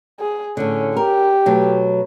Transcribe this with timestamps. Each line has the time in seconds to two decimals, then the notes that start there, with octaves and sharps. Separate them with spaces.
0.19 G#4
0.57 A2 D3 C#4
0.97 G4 A#4
1.46 B2 F#3 A3